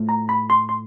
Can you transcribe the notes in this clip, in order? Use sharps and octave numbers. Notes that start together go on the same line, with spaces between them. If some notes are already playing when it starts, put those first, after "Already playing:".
Already playing: A2 F3 A3
A#5
B5
C6
C6